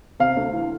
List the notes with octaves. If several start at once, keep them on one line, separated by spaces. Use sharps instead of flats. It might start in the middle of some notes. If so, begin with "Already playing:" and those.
C3 F5
D2
E3